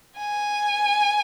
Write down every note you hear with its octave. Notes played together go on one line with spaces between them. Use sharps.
G#5